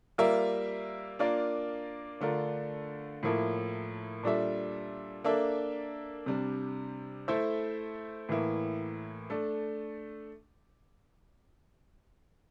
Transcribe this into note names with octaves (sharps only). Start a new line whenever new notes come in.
G3 A#3 F4 A#4 E5
A#3 D4 F4 A#4 D5
D3 A3 D4 F4 A#4
A2 F3 A#3 E4 A4
A#2 G3 D4 A4 E5
A#3 D4 A4 E5
C3 G3 D4
A3 E4 A4 C5 E5
A2 E3 A#3 E4
A3 D4 A4